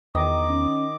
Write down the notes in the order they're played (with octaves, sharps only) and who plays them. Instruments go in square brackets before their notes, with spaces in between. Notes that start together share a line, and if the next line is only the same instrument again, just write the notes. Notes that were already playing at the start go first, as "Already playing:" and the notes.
[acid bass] E2 [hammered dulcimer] D#3 D#5 [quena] D6
[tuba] C#4